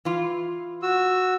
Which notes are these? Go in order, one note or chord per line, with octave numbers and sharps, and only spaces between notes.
E3 F4
F#4 E6